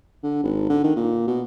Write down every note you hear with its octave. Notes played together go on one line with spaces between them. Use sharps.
D3
G#1
D3
D#3
A#2
B2